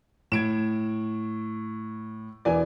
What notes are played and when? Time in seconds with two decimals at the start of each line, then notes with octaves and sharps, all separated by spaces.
0.32 A2 G#6 D7 E7
2.45 E1 E3 D5 G#5